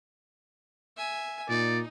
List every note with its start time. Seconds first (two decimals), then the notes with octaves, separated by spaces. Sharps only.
0.97 E5 G#5
1.49 A#2 D#4 D5